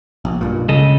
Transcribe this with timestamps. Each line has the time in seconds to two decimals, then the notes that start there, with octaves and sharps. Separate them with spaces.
0.25 A#1
0.41 B1 G2 A#2
0.69 C#2 C#3 A4 D#5